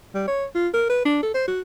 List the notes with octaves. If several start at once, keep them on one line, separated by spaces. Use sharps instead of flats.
G3
C#5
F4
A#4
B4
D4
A4
C5
F#4